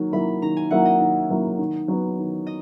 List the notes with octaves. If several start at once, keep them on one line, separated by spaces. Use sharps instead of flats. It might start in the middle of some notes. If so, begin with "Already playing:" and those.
Already playing: D#3 F#3 A#3
F#3 A#3 E4 B5
D#3 A#5
G#5
F#3 A#3 E4 F#5
D#5
D#3
F#3 A#3 E4
D#3
F#3 B3
D#3
D#5